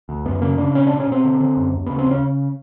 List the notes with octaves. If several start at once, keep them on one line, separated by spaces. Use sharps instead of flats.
D2
F#2 B3
C#3 A#3
C#3 D4
B2 C#4
B2 D4
C#4
B2 C4
D3
D3
F#2
D#2
C#3 B3
C4
C#3 C#4